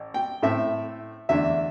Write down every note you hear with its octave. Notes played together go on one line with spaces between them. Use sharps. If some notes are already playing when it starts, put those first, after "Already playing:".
Already playing: A1
G5
A2 A3 C4 E5
E2 D3 A3 D4 E5